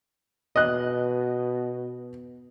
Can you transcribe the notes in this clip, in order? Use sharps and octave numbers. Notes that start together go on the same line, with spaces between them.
B2 D#5 F#6